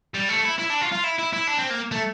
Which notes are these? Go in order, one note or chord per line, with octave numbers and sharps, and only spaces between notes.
G3
A3
E4
E4
D4
F4
F4
E4
E4
E4
D4
C4
A#3
A3